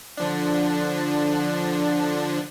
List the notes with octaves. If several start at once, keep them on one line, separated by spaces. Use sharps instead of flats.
D3 F3 D4